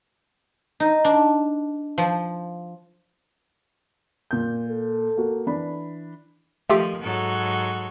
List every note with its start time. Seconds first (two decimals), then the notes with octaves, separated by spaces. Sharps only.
0.80 D#4
1.05 D4
1.98 F3
4.31 A#2 G6
4.69 A4
5.17 A#3 F#4
5.47 E3 D4 B5
6.70 D#3 F3 A3 F4 G4
7.02 G#2 F#3 A4